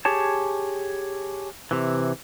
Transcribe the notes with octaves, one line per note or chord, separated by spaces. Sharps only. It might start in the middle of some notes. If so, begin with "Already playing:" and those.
G4 G#4 C#5 A5
C3 E3